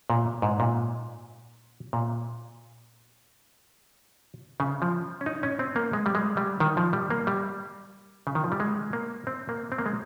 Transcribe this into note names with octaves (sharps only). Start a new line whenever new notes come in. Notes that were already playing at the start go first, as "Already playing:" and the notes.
A#2
G#2
A#2
A#2
C#3
F3
C#4
D#4
C#4
C4
A#3
G#3
G3
G#3
G3
D#3
F3
G3
A#3
G3
C#3
D#3
F3
G3
G#3
A#3
C4
A#3
C4
A#3
G#3